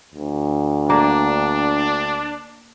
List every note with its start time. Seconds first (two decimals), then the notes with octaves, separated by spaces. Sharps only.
0.15 D2
0.90 A#3 D4